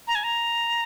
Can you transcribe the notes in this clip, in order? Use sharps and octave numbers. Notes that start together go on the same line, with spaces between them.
A#5
G#5
A#5